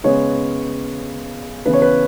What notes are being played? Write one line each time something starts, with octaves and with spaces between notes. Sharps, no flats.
C#3 G#3 B3 C#5
C#3 E3 B3 B4
C#5
B4